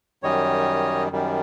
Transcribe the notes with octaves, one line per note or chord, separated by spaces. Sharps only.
F#2 D#3 G3 C#5 D#5
F#2 D#3 G3